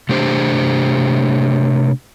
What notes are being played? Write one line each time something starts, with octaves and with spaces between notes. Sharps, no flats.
C3 A3 D4 G4 C5